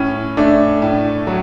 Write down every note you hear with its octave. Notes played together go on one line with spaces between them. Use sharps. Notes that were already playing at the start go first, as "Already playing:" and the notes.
Already playing: A2 C#4
A3 D4
A2 D4
F#3